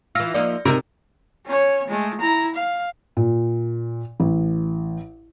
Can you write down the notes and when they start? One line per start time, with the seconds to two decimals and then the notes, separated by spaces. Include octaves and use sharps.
0.15 E3 F4 E6 F6 A#6
0.34 F3 A#3 D#4 D5
0.65 C3 D#4 F4 A#4
1.46 C#4 C#5
1.88 G#3 A3
2.20 E4 A#5
2.55 F5
3.17 A#2
4.20 A1